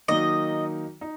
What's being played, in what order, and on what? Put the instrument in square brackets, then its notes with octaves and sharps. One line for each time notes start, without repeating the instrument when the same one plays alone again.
[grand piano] D#3 F#3 A#3 D#4 [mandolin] D#5
[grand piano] D#4